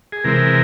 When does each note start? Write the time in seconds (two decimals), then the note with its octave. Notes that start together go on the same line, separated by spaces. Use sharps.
0.12 G#4
0.24 C3 E3 G#3 C4 A#4